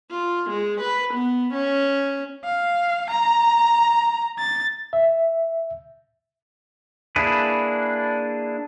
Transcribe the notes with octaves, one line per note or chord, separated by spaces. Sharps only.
F4
G#3
B4
B3
C#4
F5
A#5
A6
E5
A#3 D4 E4 G#4 B4